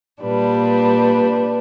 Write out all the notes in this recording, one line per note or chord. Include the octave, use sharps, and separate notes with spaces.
A#2 G3 D4 B4